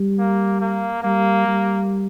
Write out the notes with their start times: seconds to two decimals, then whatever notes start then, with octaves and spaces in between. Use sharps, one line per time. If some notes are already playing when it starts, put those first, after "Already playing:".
Already playing: G3
0.19 A#3
0.61 A#3
1.03 G3 A#3
1.47 G3